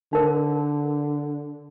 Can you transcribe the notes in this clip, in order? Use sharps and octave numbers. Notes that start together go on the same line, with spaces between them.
D3 D#4 A#4 C5